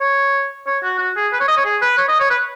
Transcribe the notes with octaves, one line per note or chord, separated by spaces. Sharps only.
C#5
C#5
F#4
F#4
G#4
B4
C#5
D#5
C#5
G#4
B4
C#5
D#5
C#5
B4